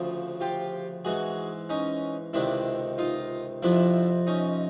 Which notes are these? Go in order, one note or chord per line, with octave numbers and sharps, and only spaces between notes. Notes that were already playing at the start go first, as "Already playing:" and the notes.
Already playing: D2 C#3 F3
F4 G4
G#2 E3 F#4 G#4
C#4 D#4
C#2 C3 D#3 D4 E4
D#4 F4
F2 C3 F3 D4 E4
C#4 D#4